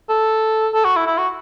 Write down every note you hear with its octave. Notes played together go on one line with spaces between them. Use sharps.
A4
A4
F#4
E4
E4
F#4